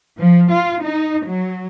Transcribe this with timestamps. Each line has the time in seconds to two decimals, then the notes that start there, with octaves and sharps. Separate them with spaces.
0.19 F3
0.51 F4
0.82 D#4
1.26 F#3